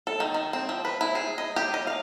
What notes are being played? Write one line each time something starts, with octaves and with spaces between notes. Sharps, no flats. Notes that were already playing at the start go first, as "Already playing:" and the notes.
A4
D#3
D#3
C4
F3
B4
E4
G#4
D#5
G4
D#5
F5